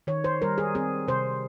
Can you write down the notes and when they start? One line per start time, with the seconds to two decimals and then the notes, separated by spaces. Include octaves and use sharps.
0.07 D#3 C#5
0.24 C5
0.42 G3 A#4
0.58 G#4
0.75 C4 G#4
1.08 C3 C5